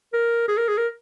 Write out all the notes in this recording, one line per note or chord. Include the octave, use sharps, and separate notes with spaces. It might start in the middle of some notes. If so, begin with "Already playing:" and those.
A#4
G#4
A#4
G#4
A#4